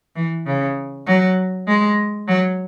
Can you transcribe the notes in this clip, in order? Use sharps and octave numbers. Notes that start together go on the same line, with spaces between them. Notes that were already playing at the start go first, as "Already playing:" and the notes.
E3
C#3
F#3
G#3
F#3